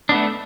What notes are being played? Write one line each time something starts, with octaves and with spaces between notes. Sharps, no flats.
A3 B3 D4